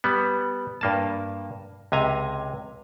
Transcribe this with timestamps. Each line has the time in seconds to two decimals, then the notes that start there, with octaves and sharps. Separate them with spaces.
0.04 G3 B3
0.81 G2 A#3 A5
1.92 C#2 C3 G#5 A#5